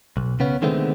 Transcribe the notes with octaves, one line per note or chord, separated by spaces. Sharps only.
B1
C#3 B3 C#4
D3 D#3 G#3 A3 B3 C4